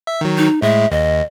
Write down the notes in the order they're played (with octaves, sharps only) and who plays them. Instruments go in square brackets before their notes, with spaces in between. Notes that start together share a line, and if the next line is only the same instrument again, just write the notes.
[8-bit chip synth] E5
D#3 F#3
[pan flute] D#4
[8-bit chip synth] A2 G#3 [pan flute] E5
[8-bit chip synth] D#2 [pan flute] D#5